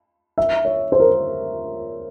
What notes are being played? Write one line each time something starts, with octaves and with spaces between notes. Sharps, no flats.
E5
C#5
C5
A#4